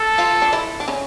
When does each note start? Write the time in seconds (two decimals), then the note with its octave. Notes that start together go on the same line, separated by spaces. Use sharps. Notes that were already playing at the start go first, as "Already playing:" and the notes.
Already playing: A4
0.18 F3 F4
0.42 D4
0.53 E3 E4
0.80 D4
0.88 C#3 C#4